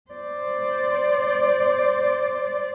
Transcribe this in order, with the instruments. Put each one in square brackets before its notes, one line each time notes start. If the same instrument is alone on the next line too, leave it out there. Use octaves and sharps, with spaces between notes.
[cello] C5 D5